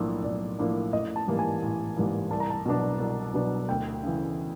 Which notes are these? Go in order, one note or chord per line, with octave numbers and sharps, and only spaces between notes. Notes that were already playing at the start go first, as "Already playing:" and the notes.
Already playing: B1 A2 F3 A#3 D4
B1 D5
A2 F3 A#3 D4
A1 D#5
A5
G#2 E3 G3 A#3
G#5
A1
G#2 E3 G3 A#3
C2 A5
A#5
A5
B2 F#3 B3 D4
C2
B2 F#3 B3 D4
D2 G5
C#3 E3